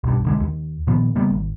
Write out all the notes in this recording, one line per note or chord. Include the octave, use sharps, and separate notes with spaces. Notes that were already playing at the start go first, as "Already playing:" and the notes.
B1 G2
B1 D3 G#3
D#2
A#2 D#3 F3 B3
C#3 G3 A#3 B3
G#1